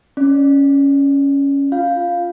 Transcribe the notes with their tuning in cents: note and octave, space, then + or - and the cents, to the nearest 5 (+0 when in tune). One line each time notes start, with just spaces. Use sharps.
C#4 +5 D5 +25
F4 +0 F5 +0